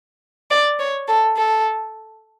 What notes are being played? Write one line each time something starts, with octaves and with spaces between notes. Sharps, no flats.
D5
C#5
A4
A4